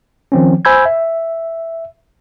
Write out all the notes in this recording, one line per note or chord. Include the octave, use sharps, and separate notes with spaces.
D#3 F3 C4 C#4
C5 G#5 B5 E6 G6 G#6
E5